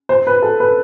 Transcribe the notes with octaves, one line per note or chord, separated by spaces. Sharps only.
C5
B4
A4
B4